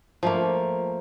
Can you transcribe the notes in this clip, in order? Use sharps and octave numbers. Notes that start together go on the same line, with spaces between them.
F3 A3 A#3